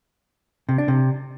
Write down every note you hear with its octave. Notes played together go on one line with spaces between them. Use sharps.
C3
D4
C3